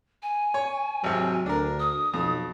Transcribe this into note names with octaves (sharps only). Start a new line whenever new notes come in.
G#5
C#5
G#1 C3 F#3
D2 D4 A#4
D#6
B1 F2